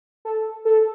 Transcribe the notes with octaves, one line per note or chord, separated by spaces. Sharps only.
A4
A4